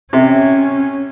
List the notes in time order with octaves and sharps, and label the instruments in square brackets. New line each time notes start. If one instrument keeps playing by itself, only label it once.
[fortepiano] C3 [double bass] C#4